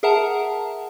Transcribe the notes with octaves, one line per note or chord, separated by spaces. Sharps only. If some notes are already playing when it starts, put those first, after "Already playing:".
G#4 A#4 E5 F#5 A5 A#5